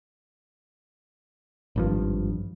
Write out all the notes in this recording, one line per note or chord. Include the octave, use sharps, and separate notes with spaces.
G#1 G2 F3